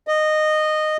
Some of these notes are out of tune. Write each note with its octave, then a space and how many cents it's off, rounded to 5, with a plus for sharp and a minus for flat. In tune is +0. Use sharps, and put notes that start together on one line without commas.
D#5 -15